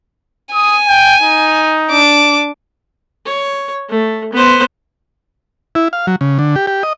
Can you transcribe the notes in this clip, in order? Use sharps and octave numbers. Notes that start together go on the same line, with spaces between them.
G#5 D#6
G5
D#4
D4 D6
C#5
A3
B3 C5
E4
F5
F#3
C#3
D3
G4
G4
D#5